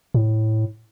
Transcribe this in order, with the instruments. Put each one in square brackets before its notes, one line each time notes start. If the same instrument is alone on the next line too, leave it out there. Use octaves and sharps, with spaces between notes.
[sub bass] A2